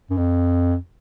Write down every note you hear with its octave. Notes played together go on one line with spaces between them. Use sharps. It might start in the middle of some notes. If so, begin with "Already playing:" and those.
F#2
F2